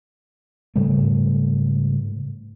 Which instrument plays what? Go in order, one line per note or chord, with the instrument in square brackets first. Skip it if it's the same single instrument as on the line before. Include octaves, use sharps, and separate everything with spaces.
[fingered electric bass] G#2 C#3 G3 A3